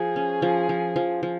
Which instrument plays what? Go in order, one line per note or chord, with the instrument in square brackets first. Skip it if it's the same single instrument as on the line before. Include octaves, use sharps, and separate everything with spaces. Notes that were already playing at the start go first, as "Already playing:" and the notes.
Already playing: [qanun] F3 [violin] G#4
[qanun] C#4
F3
F3
F3
F3